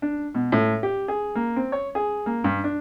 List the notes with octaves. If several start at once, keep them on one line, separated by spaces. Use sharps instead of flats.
D4
B2
A2
G4
G#4
A#3
C4
C#5
G#4
A#3
G2
D4